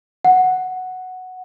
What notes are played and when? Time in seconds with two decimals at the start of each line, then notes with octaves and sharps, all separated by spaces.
0.25 F#5